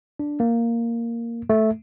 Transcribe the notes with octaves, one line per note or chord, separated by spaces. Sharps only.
D4
A#3
A3